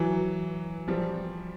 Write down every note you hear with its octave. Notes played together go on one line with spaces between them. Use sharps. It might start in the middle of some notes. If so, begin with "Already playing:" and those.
Already playing: E3 F#3
F3 G3